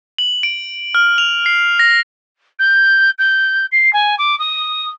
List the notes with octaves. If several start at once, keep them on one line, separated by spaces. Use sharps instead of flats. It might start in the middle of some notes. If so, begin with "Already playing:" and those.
F#7
D7
F6
F7
C7
A#6
G6
G6
C7
G#5
D6
D#6